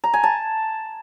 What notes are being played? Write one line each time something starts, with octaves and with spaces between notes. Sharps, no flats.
A#5
G#5
A5